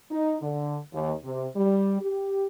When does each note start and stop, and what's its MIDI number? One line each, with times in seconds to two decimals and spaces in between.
0.11 0.37 63
0.43 0.79 50
0.94 1.13 39
1.24 1.48 48
1.56 1.99 55
2.02 2.47 67